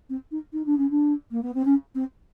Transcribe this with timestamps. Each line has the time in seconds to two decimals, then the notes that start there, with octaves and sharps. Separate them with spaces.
0.09 C4
0.31 D#4
0.53 D#4
0.66 D4
0.77 C#4
0.90 D4
1.31 A#3
1.42 B3
1.54 C4
1.65 C#4
1.95 C4